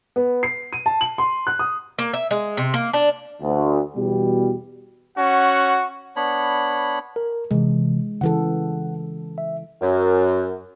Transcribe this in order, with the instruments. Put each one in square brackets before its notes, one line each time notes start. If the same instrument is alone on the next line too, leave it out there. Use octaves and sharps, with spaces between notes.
[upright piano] B3
C7
D#7
A5
F#7
C6
F#6
D#6
[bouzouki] A#3
E5
G#3
C3
A#3
D4
[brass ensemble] D2
E2 B2 G3
[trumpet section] C#4 F#4 F#5
[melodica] B3 D4 C#5 B5
[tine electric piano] A#4
[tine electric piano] C3 E3 [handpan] G#3
[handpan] C#3 E3 A4 [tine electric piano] F#5
[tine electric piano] E5
[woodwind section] F#2